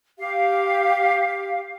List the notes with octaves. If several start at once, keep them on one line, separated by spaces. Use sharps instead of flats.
G4 F5